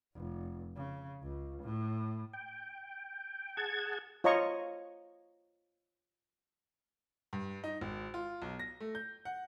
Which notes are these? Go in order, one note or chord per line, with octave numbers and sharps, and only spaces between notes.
F1
C#3
C#2
A2
G5
G#4 F#5 A5 G#6
F4 C#5 D#5 A#5 C#6
G2
D#4
G#1
F4
B1
A#6
A3
G6
F#5